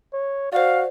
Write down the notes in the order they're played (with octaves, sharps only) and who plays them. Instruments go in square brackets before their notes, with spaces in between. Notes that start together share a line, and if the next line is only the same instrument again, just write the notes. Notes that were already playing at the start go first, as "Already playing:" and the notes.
[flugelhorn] C#5
[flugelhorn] F#4 [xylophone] C5 D5 [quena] F5